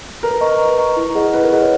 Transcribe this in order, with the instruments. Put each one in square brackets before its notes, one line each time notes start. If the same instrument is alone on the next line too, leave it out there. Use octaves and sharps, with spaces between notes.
[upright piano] A#4 [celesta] B4
[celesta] D#5 A#5 C#6
B4
D#5 A#5 C#6
E4
G#4 D#5 F#5
[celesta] E4 [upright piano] B4
[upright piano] A#4
[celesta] G#4 D#5 F#5 [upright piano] B4
[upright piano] C#5